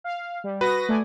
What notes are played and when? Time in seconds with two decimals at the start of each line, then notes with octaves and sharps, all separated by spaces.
0.04 F5
0.44 G3
0.61 F#4 B4 D#6 A#6
0.89 A3 D5 G#5